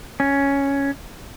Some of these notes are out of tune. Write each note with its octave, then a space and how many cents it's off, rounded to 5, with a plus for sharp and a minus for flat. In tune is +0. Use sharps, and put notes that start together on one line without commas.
C#4 +5